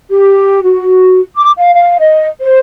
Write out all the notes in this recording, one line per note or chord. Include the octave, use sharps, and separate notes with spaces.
G4
F#4
D6
F5
F5
D#5
C5